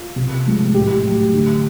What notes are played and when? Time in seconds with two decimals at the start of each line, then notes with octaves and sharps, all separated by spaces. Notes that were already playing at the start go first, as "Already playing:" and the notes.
Already playing: F4
0.16 C3
0.45 F3 G#3
0.74 A2 G4
1.04 F#3 A3
1.33 D3